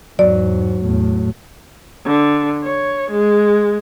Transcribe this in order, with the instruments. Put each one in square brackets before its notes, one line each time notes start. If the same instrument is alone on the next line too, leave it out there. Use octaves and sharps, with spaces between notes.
[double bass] E2 G#2 [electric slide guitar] F#3 [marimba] D5
[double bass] E2 A2
[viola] D3
C#5
G#3